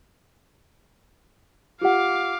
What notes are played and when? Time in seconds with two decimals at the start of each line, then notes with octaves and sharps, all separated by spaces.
1.81 F4 G4 F5 F#5 D6